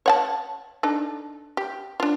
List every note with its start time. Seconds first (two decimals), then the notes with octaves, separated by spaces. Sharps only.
0.06 C#5 F#5 A5
0.83 D4 D#4 A4
1.57 G4
2.00 D4 F4